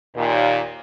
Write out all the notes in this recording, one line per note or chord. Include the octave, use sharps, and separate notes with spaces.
D#2 A#2